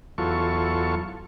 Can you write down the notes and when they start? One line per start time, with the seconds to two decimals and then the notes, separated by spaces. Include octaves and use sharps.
0.18 E2 F#3 F4 A4 C#6